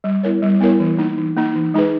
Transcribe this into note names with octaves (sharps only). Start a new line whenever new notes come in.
G3
B3 E4 A#4 C#5
G3
B3 E4 A#4 C#5
E3
A#3 D#4
E3
A#3 D#4
E3
G#3 D#4 G#4 B4